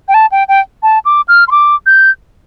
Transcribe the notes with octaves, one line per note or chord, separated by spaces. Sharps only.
G5
A5
G5
G5
A5
D6
F6
C6
D6
G6